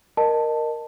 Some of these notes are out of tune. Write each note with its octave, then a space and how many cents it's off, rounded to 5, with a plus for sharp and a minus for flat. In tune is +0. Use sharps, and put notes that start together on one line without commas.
A#4 +0 D#5 -25 A5 +5